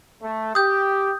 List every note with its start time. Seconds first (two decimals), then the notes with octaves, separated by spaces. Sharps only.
0.22 A3
0.55 G4 D#6 G6